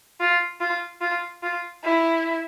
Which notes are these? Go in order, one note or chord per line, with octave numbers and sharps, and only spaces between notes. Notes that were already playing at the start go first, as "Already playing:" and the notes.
F4
F4
F4
F4
E4